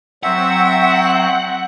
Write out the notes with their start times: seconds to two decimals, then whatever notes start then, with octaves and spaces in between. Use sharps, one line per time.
0.23 F#3 C4 E5 F#5